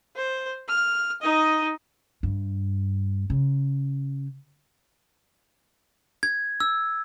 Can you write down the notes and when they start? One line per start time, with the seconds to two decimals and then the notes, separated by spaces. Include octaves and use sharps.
0.16 C5
0.69 F6
1.22 D#4 D#5
2.23 G2
3.30 C#3
6.23 G#6
6.60 E6